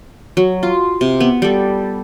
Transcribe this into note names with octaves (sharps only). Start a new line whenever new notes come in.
F#3
F4
C3
B3
G3 A4